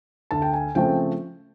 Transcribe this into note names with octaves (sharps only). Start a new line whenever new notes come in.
D2 A5
G5
G#5
C#3 F3 A3 C4 G5